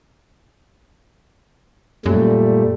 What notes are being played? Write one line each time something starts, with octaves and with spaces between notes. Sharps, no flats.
F#2 A#2 G3 A3